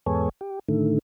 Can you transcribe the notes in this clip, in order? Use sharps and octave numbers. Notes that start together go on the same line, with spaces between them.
E2 G#2 B3 G#4 A4 C#5
G4
A2 D3 D#3 A3